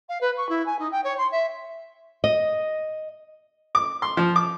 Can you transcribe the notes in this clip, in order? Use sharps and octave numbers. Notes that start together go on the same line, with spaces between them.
F5
B4
C#6
E4
G#5
D#4
G5
C#5
C6
E5
D#5
D6
C6
F3
D6